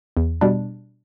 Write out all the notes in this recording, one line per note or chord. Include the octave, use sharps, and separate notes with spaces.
E2
B2 G3 D4